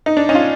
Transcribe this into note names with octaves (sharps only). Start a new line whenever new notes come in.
D#4
D4
C#4 D#4
F4